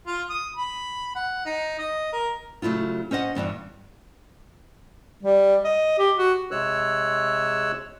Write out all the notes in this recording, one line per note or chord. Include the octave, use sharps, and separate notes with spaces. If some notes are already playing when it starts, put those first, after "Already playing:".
F4
D#6
B5
F#5
D#4
D#5
A#4
C#3 F#3 A3 E4 F4
C#4 C5 D#5 F#5
E2 G2 E3 D4
G3
D#5
G4
F#4
C3 G#3 C#5 E6 F#6